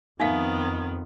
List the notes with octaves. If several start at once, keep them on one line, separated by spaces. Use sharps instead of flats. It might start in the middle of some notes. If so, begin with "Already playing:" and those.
F2 D#3 B3 D#4 E5 F5